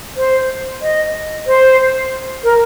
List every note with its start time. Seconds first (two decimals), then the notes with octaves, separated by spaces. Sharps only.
0.17 C5
0.82 D#5
1.47 C5
2.44 A#4